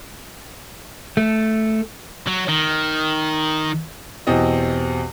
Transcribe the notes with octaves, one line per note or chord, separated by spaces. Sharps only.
A3
F#3
D#3
E2 B2 C4 G4 D#5